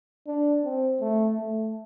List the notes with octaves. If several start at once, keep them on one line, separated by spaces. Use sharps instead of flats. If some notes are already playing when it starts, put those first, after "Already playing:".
D4
C4
A3
A3